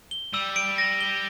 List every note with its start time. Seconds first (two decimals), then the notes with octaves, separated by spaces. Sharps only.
0.11 G7
0.34 G3 E6
0.56 D7
0.78 A#6
1.01 G7